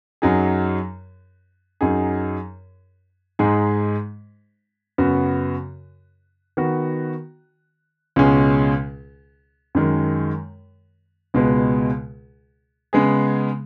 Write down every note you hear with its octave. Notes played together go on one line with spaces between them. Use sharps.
F#2 F#3 D#4 G#4
F#2 F#3 D#4 G#4
G#2 G#3 D#4 G#4
F#2 C#3 B3 F#4
D#3 B3 F#4
C#2 B2 G#3 C#4 G#4
F#2 D#3 G#3
C#2 B2 G#3 B3
C#3 G#3 B3 G#4